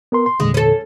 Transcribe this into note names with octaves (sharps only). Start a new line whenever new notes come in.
B3 A#4 C6
C6
E2 A#2 D3 G#3
C#4 A4